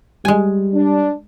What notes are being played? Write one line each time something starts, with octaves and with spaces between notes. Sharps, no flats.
G3 G#3 G#5
D4